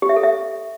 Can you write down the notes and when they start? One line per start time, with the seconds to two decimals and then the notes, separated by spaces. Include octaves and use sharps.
0.02 G4
0.09 E5
0.16 A4
0.23 E5